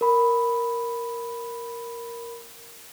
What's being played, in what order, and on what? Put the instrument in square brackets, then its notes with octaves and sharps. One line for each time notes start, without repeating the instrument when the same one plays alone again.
[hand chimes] A#4 B5